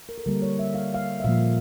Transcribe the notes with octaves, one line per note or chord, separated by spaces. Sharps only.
A#4
A4
D3 G3 A#3 A#4
C#5
E5
F5
F5
E5
A#2 F3 A#3 F5